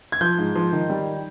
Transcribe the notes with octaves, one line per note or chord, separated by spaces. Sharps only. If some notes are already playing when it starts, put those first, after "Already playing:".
G#6
F3 G6
G#2
F3
D#3
G3